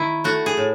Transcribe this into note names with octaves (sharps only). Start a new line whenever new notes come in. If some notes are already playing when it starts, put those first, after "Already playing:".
Already playing: D#3 E4
A3 F#4
G#4
A2